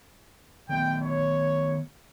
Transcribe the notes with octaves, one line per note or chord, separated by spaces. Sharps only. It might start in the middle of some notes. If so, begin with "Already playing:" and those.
D#3 A3 B3 G5
C#5